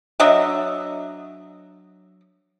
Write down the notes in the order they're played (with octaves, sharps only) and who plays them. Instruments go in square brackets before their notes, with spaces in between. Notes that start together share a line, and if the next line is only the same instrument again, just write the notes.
[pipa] F#3 D4 D#5 E5